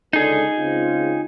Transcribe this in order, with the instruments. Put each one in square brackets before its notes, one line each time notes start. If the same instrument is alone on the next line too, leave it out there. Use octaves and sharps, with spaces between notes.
[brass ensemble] C#2 D3 [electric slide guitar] D#4 G#4
[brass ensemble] C#2 C4 F4